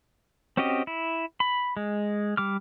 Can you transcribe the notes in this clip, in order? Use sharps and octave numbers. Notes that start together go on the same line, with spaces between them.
C4 C#4 F#4 G4 D#5
E4
B5
G#3
G3 D6 F6